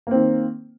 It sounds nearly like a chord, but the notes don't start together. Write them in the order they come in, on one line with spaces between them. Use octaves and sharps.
A#3 C4 D#3